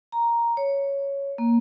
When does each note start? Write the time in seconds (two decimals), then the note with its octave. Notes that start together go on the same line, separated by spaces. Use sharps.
0.12 A#5
0.57 C#5
1.38 A#3